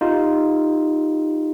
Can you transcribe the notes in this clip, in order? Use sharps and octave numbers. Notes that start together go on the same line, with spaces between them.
D#4 F4 G4